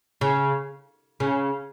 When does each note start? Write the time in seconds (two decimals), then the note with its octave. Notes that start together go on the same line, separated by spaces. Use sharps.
0.21 C#3
1.20 C#3